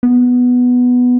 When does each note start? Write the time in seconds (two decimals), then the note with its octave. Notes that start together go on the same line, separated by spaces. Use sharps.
0.03 B3